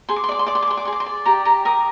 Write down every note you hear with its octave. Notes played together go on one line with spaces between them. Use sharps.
G#4 C6
D6
C6
D5 D6
C6
D5 D6
C6
D6
G#4 C6
D6
G#4 C6
D6
C6
D5
G4 A#5
G4 A#5
A#4 D#6